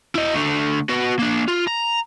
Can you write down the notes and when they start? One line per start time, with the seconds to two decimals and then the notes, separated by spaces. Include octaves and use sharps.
0.15 E4 D#5
0.35 D3 A3
0.90 B3 F#4
1.19 A#3 D4
1.48 F4
1.67 A#5